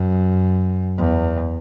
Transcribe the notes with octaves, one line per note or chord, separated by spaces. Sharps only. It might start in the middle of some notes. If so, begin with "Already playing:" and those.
Already playing: F#2
E2